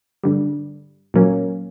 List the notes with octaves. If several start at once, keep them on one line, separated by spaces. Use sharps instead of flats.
G2 D3 G3
A#2 F#3 A#3 C#4